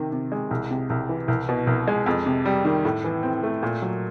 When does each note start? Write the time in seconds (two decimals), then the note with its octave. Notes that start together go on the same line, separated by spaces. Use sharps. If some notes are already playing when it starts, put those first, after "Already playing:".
Already playing: C3 D#3
0.12 C3
0.32 G#3
0.51 C2
0.71 C3
0.90 C2
1.09 E3
1.28 C2
1.49 B2
1.67 C2
1.88 G#3
2.06 F2
2.26 C3
2.45 G3
2.65 D#3
2.85 A2
3.04 E3
3.23 C4
3.43 A3
3.63 A#2
3.82 F#3